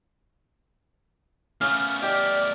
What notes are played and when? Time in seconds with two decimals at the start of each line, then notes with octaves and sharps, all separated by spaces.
1.61 C#3 A3 B3 F5 C#6 D6
2.02 G4 D5 D#5 F6